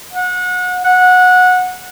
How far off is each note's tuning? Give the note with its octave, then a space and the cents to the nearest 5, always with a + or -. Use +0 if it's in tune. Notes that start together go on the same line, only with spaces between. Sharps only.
F#5 -30
F#5 -20